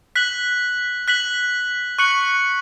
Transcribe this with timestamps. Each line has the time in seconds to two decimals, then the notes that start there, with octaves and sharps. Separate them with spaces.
0.16 F#6 B6 F#7
1.08 F#6 B6 F#7
1.98 C#6 F#6 C#7 F#7